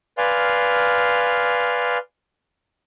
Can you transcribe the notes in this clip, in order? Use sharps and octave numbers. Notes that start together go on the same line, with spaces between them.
B4 D5 F5 G#5 C6 F6